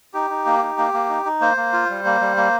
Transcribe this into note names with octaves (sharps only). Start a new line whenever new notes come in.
D#4 G4
D#4
A#3
D#4
A#3
A#3
D#4
D#4
A#3 C5
A#3
F4
G3
A#3
G3
A#3